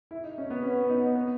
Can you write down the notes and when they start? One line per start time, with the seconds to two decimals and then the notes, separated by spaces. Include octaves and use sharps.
0.11 E4
0.24 D#4
0.38 C#4
0.50 B3
0.63 B3 C#4
0.89 D#4
1.15 B3